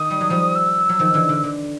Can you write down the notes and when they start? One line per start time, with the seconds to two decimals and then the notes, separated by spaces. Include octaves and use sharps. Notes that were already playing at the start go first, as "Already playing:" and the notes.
Already playing: D#3 D#6
0.10 G3
0.21 F#3
0.30 F3 G3
0.55 E6
0.89 F#3
0.99 D#3 F3
1.14 D3 E3
1.29 D3
1.44 D3